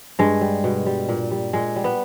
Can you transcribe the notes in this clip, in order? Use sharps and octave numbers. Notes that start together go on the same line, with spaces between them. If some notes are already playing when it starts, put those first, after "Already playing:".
G2 G#3
G3
B2
G3
A#2
G3
A#2 G#3
G3
B3